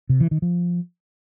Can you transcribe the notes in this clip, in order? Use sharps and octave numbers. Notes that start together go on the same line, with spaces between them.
C3
E3
D#3
F3